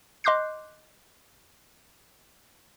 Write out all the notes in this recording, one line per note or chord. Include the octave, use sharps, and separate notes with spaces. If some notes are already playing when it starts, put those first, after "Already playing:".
D#5 C6 D6 F#6 G6 C7